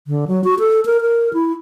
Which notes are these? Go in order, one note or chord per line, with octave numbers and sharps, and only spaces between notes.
D3
F#3
F#4
A4
A#4
A#4
E4